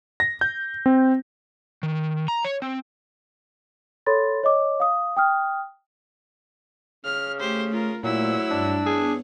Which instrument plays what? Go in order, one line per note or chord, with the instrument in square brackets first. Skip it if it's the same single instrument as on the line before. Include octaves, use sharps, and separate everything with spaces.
[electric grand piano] A#6
G6
C4
[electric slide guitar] D#3
A#5
C#5
C4
[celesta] A4 C#5 B5 C6 A6
C#5 D#5 D6
F5 D#6
G5 D#6 F6
[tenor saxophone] C#3 [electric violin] F6
[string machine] A3 [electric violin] G4 C5
[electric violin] F4 A#4
[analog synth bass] A#2 [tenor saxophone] F#3 [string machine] A3 C5 [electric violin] E4 E6
[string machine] G2 [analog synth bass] D4
[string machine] B3 C#5 [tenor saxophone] G#4